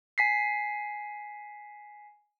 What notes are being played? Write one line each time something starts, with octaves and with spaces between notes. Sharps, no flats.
G#5 B6 C7